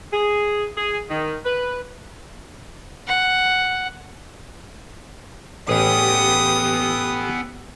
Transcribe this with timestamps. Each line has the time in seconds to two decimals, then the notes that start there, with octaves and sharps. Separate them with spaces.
0.13 G#4
0.77 G#4
1.09 D#3
1.45 B4
3.07 F#5
5.69 A1 B3 G4 G#4 D#6